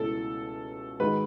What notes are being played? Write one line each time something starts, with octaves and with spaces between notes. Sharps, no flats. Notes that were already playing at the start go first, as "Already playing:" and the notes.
Already playing: C#2 B2 A3 C#4 E4 A4
G#2 D#3 G#3 D#4 F#4 B4